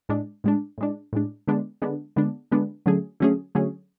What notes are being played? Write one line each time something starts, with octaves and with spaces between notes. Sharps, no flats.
A2 G#3 D4
A2 G#3 D4
A2 G#3 D4
A2 G#3 D4
D3 G#3 B3 D4
D3 G#3 B3 D4
D3 G#3 B3 D4
D3 G#3 B3 D4
D3 F#3 A3 C#4 G#4
D3 F#3 A3 C#4 G#4
D3 F#3 A3 C#4 G#4